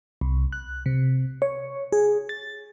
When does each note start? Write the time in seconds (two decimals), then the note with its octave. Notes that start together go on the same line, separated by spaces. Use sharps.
0.21 C2
0.53 F#6
0.86 C3
1.42 C#5
1.92 G#4
2.29 A6